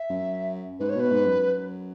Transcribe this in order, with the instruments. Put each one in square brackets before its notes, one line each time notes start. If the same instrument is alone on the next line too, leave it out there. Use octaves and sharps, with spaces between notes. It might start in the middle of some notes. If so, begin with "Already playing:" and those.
Already playing: [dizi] E5
[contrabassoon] F#2
[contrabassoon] G#2 [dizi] B4
[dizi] C#5
[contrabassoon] B2 [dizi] B4
[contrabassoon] G#2
F#2